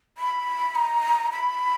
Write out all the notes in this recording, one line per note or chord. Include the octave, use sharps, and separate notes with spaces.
B5
A#5
B5